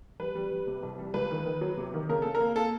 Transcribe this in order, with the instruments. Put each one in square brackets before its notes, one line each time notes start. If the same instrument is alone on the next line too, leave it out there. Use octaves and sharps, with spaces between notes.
[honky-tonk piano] G3 B4
G3
G3
C3
C2
G3
C#2 B4
D#3
D#3
F#3
C3
D#3
C#3 A#4
C#3 A4
A#4
A#3
A#3 A4